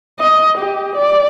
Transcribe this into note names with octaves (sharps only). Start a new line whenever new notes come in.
D#5
G4
D5